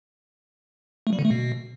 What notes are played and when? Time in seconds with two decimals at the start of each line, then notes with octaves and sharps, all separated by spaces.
1.07 A3
1.13 G3
1.19 D3
1.25 A3
1.31 B2